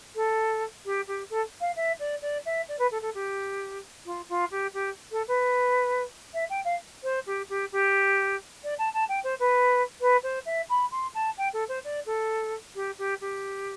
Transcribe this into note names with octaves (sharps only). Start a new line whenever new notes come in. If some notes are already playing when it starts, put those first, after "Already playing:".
A4
G4
G4
A4
F5
E5
D5
D5
E5
D5
B4
A4
A4
G4
F4
F4
G4
G4
A4
B4
E5
G5
F5
C5
G4
G4
G4
D5
A5
A5
G5
C5
B4
B4
C5
E5
B5
C6
A5
G5
A4
C5
D5
A4
G4
G4
G4